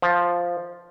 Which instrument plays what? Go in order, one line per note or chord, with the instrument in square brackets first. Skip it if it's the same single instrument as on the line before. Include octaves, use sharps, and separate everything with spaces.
[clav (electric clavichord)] F3